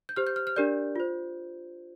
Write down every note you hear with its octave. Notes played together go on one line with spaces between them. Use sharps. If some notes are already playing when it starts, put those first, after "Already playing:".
G6
G4 C5 F6
G6
F6
F6
D4 G4 A#4 D5 G6
F4 C5